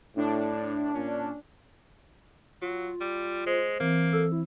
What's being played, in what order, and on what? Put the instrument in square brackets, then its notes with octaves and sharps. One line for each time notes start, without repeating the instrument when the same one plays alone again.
[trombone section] A2 [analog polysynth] D4
[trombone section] A#2 C#4
[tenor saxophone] F#3 [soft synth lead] F4
[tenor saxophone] G3
[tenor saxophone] G#3 [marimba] C5
[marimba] E3 C4 [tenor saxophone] A#3
[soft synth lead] A4 [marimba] E6
[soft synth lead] E4